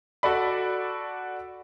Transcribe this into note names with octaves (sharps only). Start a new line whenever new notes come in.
F#4 A4 D5 B5